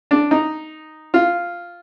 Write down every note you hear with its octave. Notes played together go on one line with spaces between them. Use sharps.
D4
D#4
F4